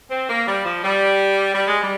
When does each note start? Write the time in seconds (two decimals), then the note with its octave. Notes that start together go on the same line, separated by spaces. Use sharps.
0.10 C4
0.29 A#3
0.46 G3
0.64 F3
0.83 G3
1.54 G3
1.68 G#3
1.82 G3